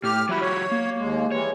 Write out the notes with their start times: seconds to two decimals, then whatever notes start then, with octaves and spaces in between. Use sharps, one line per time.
0.04 A2 G4 F6
0.29 F#3 E4 F#4 G4
0.41 C#5
0.72 A#3
0.98 D#2 G#3
1.31 E3 G3 G#3 C#5